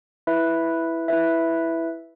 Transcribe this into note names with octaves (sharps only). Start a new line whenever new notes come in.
E4 B4 E5
E4 B4 E5